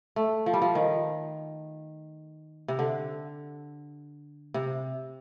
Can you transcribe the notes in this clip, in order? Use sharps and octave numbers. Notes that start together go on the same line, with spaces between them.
A3
F3
G3
F3
D#3
C3
D3
C3